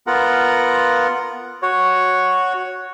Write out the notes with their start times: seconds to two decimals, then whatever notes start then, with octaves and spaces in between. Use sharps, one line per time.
0.07 B3 F4 A#4 F#5
1.62 F#4 C#5